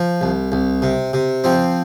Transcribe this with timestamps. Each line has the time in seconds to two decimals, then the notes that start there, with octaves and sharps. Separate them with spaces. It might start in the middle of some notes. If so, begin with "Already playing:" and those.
Already playing: F3
0.21 C2
0.52 C2
0.82 C3
1.13 C3
1.44 F3 C4